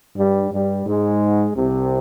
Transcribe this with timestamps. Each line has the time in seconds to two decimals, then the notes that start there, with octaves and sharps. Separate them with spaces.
0.16 G2 G3
0.51 G2 G3
0.86 G#2 G#3
1.56 C2 C3